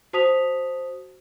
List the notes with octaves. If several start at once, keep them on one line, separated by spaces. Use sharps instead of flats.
F#4 C5 A5 D#6 B6 F7